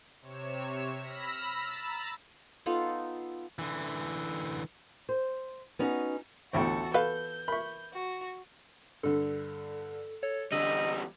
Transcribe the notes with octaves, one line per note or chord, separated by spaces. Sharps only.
C3 C#5 E7
B5 E6 F6 A#6 B6
A#5 B5 E6 A6
B3 D#4 F4 A4
D3 E3
C5
B3 C#4 D#4 F#4
A1 D2 E3 B3 F4 F#4 A4 G5
A4 B4 F5 B5 G6
A#4 E5 B5 C#6
F#4
G2 D3 A4
A4 C#5
E2 D3 G3 D#5 E6